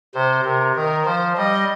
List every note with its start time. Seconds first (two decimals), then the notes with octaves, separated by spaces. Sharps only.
0.15 C3 C5
0.44 C3 A#4
0.76 D#3 A#4
1.06 F3 C5
1.36 G3 D#5